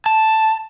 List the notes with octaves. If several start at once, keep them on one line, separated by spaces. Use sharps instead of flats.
A5